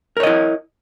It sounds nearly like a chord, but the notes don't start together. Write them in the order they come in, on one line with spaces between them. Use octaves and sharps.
A#4 C#5 D#5 E4